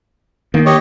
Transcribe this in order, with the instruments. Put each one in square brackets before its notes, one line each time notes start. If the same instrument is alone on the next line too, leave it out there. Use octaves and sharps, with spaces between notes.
[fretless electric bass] D#3 A#3
[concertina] G4 C#5 D#5